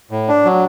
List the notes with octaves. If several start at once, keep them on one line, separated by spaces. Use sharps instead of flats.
A2
D4
F#3